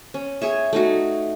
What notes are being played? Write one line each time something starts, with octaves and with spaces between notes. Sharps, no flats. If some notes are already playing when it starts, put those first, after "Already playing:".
C#4
G#4 C#5 E5
A3 D#4 F#4